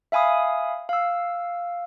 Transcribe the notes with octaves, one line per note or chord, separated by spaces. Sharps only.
E5 F5 G#5 B5 D#6
F5 E6